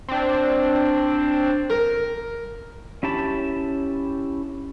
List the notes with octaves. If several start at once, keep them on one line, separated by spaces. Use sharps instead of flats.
C4 D4
A#4
C#4 E4 G4 A5 B5